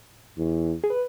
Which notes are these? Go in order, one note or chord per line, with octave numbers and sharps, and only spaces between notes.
E2
G#4
B4